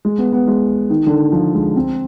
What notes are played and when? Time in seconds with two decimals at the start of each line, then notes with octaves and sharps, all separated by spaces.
0.05 G#3
0.18 B3
0.33 B3
0.48 G#3
0.90 D#3
1.07 D3
1.11 D#3
1.33 F3
1.54 G#3
1.76 C4